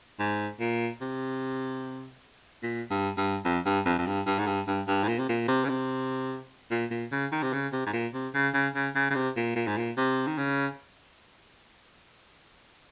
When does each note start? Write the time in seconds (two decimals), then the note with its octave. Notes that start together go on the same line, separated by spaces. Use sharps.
0.19 G#2
0.60 A#2
1.01 C3
2.63 A#2
2.91 G2
3.18 G2
3.45 F2
3.66 G2
3.86 F2
3.99 F2
4.07 G2
4.27 G2
4.39 G#2
4.47 G2
4.68 G2
4.88 G2
5.03 G#2
5.08 A#2
5.19 C3
5.29 A#2
5.48 C3
5.65 C#3
5.69 C3
6.71 A#2
6.91 A#2
7.12 C#3
7.32 D#3
7.43 C3
7.53 C#3
7.73 C3
7.86 G#2
7.93 A#2
8.14 C3
8.34 C#3
8.54 C#3
8.75 C#3
8.95 C#3
9.10 C#3
9.15 C3
9.37 A#2
9.56 A#2
9.67 G#2
9.77 A#2
9.97 C3
10.27 D#3
10.38 C#3